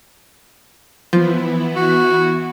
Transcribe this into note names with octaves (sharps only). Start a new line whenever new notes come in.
E3 F3 B3 E4
F#4